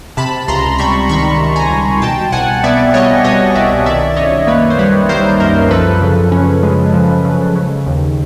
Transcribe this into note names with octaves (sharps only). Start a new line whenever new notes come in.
C3 A5 B5
C#2 A#5 C6
G3 B5 C#6
D#3 B5 C#6
C3
G#5 A#5
C#2
B2 G5 A5
C2 F#5 G#5
B3 D5 E5
G3 C#5 D#5
B2 C#5 D#5
C2 D5 E5
D#3 D5 E5
F#2 C#5 D#5
A#3 B4 C#5
C5
G3 B4 C#5
D#3 A#4 C5
F#2 A#4 C5
F3 A4 B4
C#3
C#4
G#3
F3
C#3
C#3
D#2